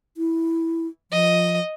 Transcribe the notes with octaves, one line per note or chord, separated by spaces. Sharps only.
E4
F3 D#5